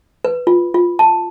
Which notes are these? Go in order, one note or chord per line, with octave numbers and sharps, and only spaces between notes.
B4
F4
F4
A5